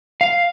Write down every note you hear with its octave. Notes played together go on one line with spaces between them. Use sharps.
F5